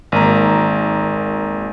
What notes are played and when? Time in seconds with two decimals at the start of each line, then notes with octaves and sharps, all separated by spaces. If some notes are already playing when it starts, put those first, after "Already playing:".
0.12 G#1 A#3 A#5